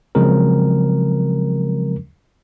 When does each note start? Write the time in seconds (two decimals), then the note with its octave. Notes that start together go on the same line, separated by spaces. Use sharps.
0.15 C#3 F3 F#3 G#3 C4 A#4